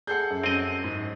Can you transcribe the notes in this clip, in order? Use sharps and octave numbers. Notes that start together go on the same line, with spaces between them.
G#4 A4 F#5 G6 C7
F#2
F#2 C4 D#5
G#2